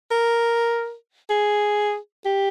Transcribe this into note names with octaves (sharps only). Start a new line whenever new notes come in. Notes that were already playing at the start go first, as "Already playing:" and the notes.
A#4
G#4
G4